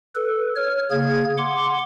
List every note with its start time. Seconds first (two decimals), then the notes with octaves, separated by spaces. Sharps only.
0.15 A4 B4
0.56 C#5 F6
0.91 C#3 A#3 G#4 G#6
1.37 F#5 C6 D6